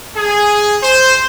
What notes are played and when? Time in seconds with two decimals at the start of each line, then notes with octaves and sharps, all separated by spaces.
0.16 G#4
0.82 C5